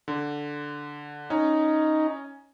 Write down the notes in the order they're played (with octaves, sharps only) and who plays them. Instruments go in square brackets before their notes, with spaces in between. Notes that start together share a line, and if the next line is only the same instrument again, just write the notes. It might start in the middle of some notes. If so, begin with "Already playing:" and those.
[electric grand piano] D3
[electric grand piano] C#4 [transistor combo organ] D#4